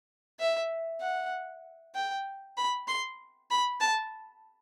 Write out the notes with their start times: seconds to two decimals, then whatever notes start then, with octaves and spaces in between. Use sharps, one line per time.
0.40 E5
1.01 F#5
1.95 G5
2.57 B5
2.88 C6
3.50 B5
3.80 A5